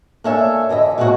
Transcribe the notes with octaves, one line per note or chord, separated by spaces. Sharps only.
A#3 D4 A4 C#5 E5 G#5
D3 E3 D#5 E5
B2 G#3 A#3 C#4 F#4 C#5